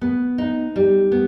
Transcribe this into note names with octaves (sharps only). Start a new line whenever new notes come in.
B3
D#4
G3
B3